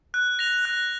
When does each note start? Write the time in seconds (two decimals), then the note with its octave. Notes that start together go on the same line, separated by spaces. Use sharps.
0.14 F#6
0.39 A#6 F7
0.65 F#6